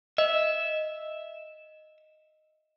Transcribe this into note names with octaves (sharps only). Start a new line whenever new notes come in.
D#5 E5